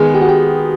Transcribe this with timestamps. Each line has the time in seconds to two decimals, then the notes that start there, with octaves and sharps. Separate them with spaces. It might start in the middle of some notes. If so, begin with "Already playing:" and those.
Already playing: D#3 G#3 B3 G#4
0.15 G4
0.22 F#4
0.29 G4